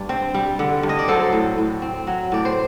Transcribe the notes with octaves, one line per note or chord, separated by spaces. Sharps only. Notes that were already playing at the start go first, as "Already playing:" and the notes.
Already playing: G2 D5
C4
G3
D3
G2
D#5
D5
F#3 A4 C5
A2
A2
C4
F#3
A2 D5
C5